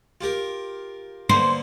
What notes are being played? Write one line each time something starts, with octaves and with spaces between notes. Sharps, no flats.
F4 G4 A#4
D3 A#3 B3 C5